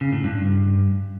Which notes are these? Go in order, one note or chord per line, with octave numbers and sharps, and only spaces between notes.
C#3
A2
G2